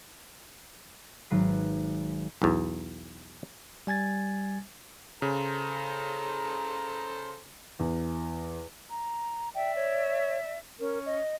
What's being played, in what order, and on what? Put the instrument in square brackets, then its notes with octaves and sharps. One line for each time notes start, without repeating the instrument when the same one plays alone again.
[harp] G#1 F#3 B4 C7
[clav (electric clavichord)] B1 E2
[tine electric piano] G3 G#5 G#6 A6
[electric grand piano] C#3 [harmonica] A4 C5 A#5
[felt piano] E2
[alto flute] A#5
[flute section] D5 E5 [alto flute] G5
[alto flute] C#5
[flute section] C#4 [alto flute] A#4
[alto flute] D#5